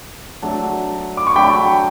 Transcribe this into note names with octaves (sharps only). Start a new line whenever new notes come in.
F#3 A3 D4
D6
C#6
F#3 A3 D4 G5 B5